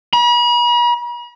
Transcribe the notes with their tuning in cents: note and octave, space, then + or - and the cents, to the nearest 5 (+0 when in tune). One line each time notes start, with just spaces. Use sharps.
B5 -45